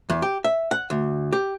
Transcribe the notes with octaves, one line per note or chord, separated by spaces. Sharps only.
E2
G4
E5
F#5
D2
G4